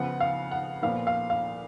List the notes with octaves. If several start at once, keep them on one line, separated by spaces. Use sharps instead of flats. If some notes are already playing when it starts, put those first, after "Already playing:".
Already playing: C#3 F3 B3 F#5
F5
F#5
A#2 F3 B3 F5
F5
F5